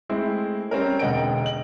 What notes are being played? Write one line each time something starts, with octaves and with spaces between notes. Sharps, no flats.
G#3 A3 C4 E4
G3 C4 C#4 A#4
E1 D3 D#5 F#5 G5 D7
D#5 F#7